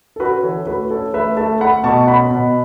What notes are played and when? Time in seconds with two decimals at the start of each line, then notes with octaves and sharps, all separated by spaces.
0.16 A4
0.20 C#4 F#4 B4
0.43 E3 A4 C#5
0.67 A3 F#4 B4
0.90 C#4 A4 C#5
1.14 A3 B4 E5
1.37 A3 E5 A5
1.61 A3 F#5 B5
1.83 B2 A5 C#6
2.07 C#4 F#5 B5
2.31 B2